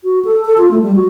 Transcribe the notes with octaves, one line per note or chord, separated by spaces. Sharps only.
F#4
A4
A4
F4
A3
G3
F#4